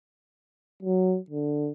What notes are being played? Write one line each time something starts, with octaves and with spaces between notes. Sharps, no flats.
F#3
D3